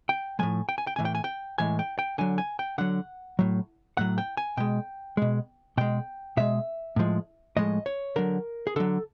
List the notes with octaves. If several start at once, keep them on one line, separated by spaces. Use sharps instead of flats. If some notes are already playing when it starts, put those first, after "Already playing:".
G5
A2 F3 G#3 G#5
G5
G#5
G5
A2 E3 G#3 G#5
G5
G#5
G5
A2 E3 G#3 G#5
G5
G5
D3 F#3 G#5
G#5
G5
D3 F#3 F#5
A2 F#3
A2 F#3 F#5
G5
G#5
B2 G#3 G5
B2 G#3
B2 G#3 G5
B2 G#3 E5
A2 F3 G#3
A2 F3 G#3 D#5
C#5
D3 F#3 A#4
G#4
D3 F#3 A4